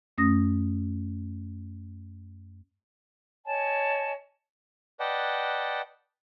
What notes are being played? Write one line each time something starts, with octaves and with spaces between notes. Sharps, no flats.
F#2 A3 C#4 D#6 A#6
C#5 D#5 G#5 A5
B4 D5 D#5 F#5 G5 A5